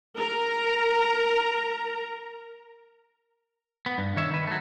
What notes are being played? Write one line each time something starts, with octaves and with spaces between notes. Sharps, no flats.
A#4 A#5
B3
G2
D#3 C#5 E5
D#3 B4
F#3 A3